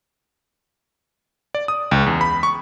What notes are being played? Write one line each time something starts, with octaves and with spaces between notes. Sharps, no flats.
D5
D#6
C#2
E2
B5
C#6